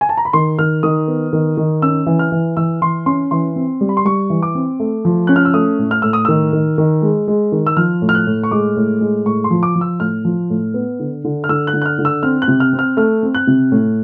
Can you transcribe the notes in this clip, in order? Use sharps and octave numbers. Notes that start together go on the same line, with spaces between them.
G#5
A5
A#5
B5
D#3 C6
D#3 F6
D#3 D#6
B3
D#3
D#3
C#4 E6
E3
F6
E3
E3 E6
E3 C6
C#4 C6
E3 C6
C4
G3
B5
C6
G3 C#6
E3
D6
C4
A3
F3
C#4 F#6
F6
E6
A3 D#6
A2
F6
A2 E6
D#6
D#3 E6
D#3
D#3
G#3
G#3
D#3
E6
F3 F6
A2
F6
F#6
A2
C#6
G#3 D6
A2
G#3
A2 C#6
C6
F3
D6
F3
E6
A2 F6
F3
A2
B3
D3
D3
F6
D3 E6
F#6
D3
F#6
F6
D3
E6
C4 F6
F#6
C3
F6
C4
F6
A3 F6
C4
F#6
C3
A2